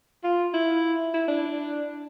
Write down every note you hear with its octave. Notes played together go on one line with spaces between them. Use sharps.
F4
E4
E4
D4